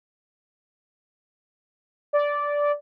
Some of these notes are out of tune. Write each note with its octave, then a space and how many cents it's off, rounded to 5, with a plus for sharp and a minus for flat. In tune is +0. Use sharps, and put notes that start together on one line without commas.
D5 -10